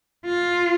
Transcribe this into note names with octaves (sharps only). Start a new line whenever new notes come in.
F4